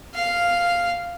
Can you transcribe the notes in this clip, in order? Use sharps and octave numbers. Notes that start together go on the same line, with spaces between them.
F5